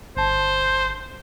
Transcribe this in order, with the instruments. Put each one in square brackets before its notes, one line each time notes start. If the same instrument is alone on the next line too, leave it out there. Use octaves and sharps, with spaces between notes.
[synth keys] G1 A5 [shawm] C5